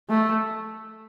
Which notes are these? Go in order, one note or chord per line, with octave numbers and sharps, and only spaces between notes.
A3